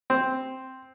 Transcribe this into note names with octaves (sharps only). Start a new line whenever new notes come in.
C4